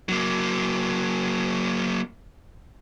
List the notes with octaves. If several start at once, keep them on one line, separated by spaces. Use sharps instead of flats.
F#3 A#3